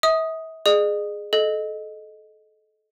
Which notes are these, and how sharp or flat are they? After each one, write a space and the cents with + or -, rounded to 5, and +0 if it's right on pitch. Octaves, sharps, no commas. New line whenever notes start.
E5 -40 D#6 +0
G#4 +0 D#5 -45 D#6 -5
A4 -25 D#5 -5